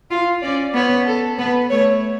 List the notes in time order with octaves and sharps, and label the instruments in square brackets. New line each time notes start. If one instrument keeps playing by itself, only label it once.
[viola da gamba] F4 [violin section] F5
[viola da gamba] C#4 [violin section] D5
[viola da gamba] B3 [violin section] C#5
[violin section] A4
[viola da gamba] B3 [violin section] B4
[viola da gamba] A3 [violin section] C#5